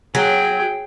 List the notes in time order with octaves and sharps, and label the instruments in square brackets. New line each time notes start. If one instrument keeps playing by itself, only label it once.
[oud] F#3 [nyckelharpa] G#4 G5